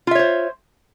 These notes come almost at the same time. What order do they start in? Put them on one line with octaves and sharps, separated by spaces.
F4 E5 C#5 C5